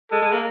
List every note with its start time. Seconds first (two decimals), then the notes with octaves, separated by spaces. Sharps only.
0.11 G#3 A4
0.22 G#3
0.32 A#3